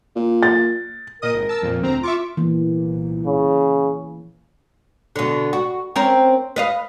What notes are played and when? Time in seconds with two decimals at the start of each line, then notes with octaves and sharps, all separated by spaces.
0.16 A#2
0.43 A6
1.22 A#2 A#4 D#5 D#6
1.34 G#1
1.49 A5 E6
1.62 F2 A#2
1.82 D2 C4 A#5
2.03 F4 E5 C#6 D6
2.37 C2 A#2 E3 A#3
3.26 C#3
5.16 B2 D3
5.53 F#4
5.96 C4 C#4 A#4
6.56 B4 D#5 F5